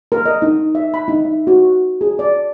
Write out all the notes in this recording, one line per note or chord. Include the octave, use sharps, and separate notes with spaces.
A#4
D#5
D#4
E5
B5
D#4
E5
F#4
G#4
D5